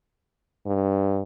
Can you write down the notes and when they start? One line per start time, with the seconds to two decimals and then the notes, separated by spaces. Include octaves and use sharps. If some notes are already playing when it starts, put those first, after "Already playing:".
0.67 G2